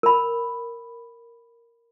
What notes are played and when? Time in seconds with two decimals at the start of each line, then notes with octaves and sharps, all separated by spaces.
0.03 A#4 B5